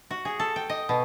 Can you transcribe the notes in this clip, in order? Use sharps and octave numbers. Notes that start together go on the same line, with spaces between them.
F#4
G#4
A4
G5
D#5
B2